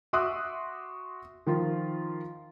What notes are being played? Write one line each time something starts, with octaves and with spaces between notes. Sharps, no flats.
F#4 E5 C6 D6 D#6 F#6
D#3 F3 F4